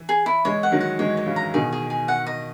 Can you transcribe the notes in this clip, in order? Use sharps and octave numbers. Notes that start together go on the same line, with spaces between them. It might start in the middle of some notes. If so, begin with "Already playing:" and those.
Already playing: E3
G#4
E4
E3 G#3 C#5
F#5
D#3 F#3
F#5
E3 G#3 C#5
C#5
C#3 E3
A#5
B2 D#3 G#4
G#4
G#4
F#5
D#5